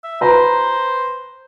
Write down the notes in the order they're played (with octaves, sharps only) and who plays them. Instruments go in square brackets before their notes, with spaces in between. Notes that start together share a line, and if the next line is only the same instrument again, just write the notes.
[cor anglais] E5
[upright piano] B4 A#5 [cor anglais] C5